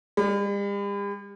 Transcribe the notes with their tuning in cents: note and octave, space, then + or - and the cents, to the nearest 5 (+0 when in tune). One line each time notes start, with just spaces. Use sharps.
G3 +45